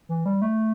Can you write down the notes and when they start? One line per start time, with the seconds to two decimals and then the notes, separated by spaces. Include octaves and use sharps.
0.09 E3
0.26 G3
0.42 A3